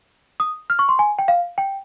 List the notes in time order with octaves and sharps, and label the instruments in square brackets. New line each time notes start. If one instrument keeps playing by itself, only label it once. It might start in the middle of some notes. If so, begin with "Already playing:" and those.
[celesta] D#6
F6
C#6
C6
G#5
G5
F5
G5